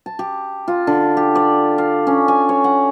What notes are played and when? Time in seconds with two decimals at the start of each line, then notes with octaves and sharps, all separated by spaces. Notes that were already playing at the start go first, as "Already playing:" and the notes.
0.06 A5
0.19 G4
0.68 F4
0.87 D3
1.17 G4
1.35 D5
1.78 F5
2.07 C#4
2.28 G#5
2.49 C#5
2.64 F#5